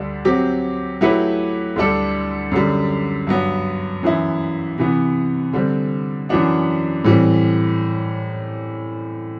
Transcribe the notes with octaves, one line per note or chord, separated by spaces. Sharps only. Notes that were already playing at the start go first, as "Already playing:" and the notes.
Already playing: D2 D3 G3 D4
F#3 C4 G4
F#3 A3 E4 G4 B4
D2 D3 G3 D4 A4
F#2 D3 G3
G2 F#3 B3
F#2 E3 B3 E4
C3 E3 B3
D3 G3 C4
F#2 E3 B3 D4 F#4
A2 E3 G3 C4